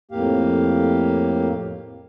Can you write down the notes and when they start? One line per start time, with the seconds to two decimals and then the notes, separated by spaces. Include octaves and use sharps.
0.11 F2 A2 A#3 G4 F5